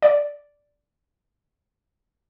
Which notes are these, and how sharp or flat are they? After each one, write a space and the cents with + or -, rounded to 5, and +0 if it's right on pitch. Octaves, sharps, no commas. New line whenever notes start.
D5 -5